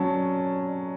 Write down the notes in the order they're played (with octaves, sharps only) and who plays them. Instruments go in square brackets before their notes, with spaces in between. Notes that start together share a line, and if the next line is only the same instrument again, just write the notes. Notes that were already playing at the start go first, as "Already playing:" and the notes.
Already playing: [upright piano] F#3 C#4 A5